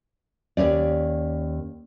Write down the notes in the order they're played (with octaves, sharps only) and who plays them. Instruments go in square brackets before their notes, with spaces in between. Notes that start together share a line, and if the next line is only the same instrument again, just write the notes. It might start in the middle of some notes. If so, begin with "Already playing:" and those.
[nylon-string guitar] D#2 G#2 C#4 D5